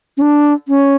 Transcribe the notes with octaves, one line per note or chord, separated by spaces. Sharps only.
C#4
D4
C#4